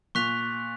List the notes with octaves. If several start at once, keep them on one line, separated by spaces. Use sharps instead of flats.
A#2 C#6 F#6 B6 F7